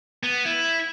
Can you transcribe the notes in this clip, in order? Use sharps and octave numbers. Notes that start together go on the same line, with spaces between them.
B3
E4